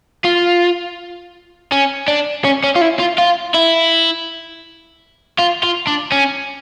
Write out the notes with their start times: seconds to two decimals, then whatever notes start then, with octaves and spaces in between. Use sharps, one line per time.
0.25 F4
1.72 C#4
2.08 D4
2.44 C#4
2.64 C#4
2.75 F4
2.81 E4
2.99 F4
3.18 F4
3.54 E4
5.39 F4
5.63 F4
5.87 D4
6.12 C#4